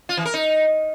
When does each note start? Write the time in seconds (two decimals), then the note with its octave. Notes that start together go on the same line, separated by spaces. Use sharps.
0.09 F4
0.17 E3
0.25 A#4
0.34 D#4